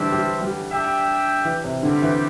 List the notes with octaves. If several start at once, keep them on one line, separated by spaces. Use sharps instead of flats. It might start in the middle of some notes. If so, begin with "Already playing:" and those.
Already playing: D3 E3 G3 D4 C5 E5
G3
G3
D4 G4 E5 G5
E3
C3
D3 G3 C4 G4
E3